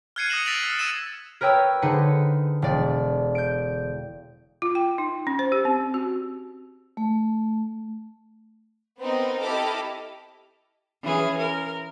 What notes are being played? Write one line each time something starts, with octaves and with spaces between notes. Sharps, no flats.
F6 F#6 G#6 C7 C#7 D#7
D#6 G#6 A#6 C#7 E7 F#7
E6 A6 B6 D7 F7 F#7
F6
E6 F6 A6 C#7 D#7 E7
A#4 B4 C#5 G5 E6
D3 D#4 G#4 B4 C5 C#7
E1 D5
G6 D7
F4
G5
D#4
C#4
C5
G4
C4
F#4
A3
B3 C4 D#4 A#4
E4 G4 A4 D#5 D6 F6
E3 C#4 G#4
A#4